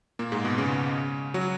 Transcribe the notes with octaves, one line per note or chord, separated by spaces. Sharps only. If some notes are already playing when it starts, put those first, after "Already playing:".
A#2 A#3
G#2 G#3
B2 B3
C#3 C#4
F#3 F#4